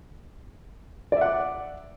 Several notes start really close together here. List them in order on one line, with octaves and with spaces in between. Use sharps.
D5 E5 F#5 D6